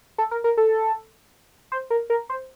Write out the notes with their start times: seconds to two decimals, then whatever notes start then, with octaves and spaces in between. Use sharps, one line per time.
0.18 A4
0.31 A#4
0.44 A#4
0.57 A4
1.72 C5
1.90 A#4
2.10 A#4
2.29 C5